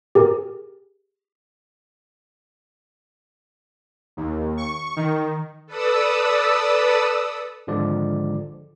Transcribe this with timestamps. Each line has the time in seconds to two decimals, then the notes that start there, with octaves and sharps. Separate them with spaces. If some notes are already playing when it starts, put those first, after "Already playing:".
0.15 G4 G#4 A#4
4.17 D#2
4.57 C#6
4.96 D#3
5.66 A4 B4 D5 D#6 E6
7.67 G#1 D3 F3 G#3 D5